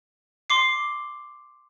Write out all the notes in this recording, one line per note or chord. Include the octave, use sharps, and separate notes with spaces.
C6 D6 C7